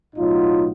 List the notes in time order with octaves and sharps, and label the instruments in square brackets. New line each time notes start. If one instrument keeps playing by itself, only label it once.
[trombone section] B1 A2 F#3 B3 D#4 F4